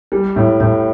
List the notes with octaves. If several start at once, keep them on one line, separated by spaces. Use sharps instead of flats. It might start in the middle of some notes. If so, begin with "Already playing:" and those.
G3
A2
A2